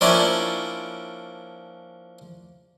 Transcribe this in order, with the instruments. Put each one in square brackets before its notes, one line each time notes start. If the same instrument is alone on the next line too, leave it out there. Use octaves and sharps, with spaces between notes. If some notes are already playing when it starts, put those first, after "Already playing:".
[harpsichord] F3 A#3 C#4 D4 E4 C#5